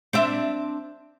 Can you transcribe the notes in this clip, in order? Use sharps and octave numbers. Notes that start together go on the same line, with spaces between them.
C4 D4 E5